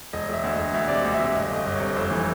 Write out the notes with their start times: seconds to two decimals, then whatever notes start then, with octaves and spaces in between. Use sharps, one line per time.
0.13 E1 D#5
0.29 E1 E5
0.43 D2
0.54 D#5
0.59 E1
0.74 D2 E5
0.88 C3 D5
0.95 D#5
1.05 D2
1.14 E5
1.20 C3
1.35 G1 D#5
1.51 G1 D#5
1.66 G1
1.76 C3 C#5
1.96 F2 C5
2.11 E3